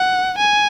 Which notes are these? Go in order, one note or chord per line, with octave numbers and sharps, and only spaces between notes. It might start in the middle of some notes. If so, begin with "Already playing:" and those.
Already playing: F#5
G#5